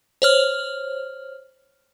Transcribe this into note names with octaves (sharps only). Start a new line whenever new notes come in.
C5 C#5 F6